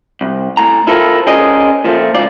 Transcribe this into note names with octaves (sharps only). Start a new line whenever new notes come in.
C2
A2 A#5
E4 F4 A4 A#4 C5
C#4 G#4 A#4 C5 D5 D#5
A#2 F3 G3 A3
C#2 F4 D5